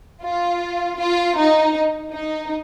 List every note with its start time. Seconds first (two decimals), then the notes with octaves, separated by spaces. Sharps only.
0.23 F4
0.99 F4
1.37 D#4
2.12 D#4